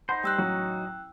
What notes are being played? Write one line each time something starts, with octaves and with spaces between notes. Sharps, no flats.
D#4 C5 F#5 B5 C6
G3 G5 E6 F#6
A1 F#3 D#4 F#4